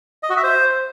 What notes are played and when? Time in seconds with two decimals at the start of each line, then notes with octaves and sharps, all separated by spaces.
0.23 D#5
0.30 F#4
0.37 E5
0.44 C5